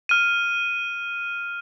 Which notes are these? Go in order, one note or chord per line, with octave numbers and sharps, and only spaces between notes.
F6 D#7